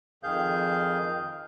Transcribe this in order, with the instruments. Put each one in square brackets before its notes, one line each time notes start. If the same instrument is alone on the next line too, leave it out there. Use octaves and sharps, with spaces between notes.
[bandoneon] F2 D#3 G#4 F5 G6